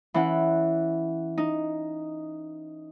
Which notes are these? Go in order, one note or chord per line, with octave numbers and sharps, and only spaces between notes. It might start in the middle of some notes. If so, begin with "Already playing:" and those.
E3 C#4 F#5
D#4